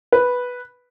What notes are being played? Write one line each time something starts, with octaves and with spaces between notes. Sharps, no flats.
B4